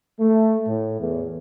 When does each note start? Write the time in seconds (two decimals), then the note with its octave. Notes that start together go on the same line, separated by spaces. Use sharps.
0.20 A3
0.68 A2
1.01 E2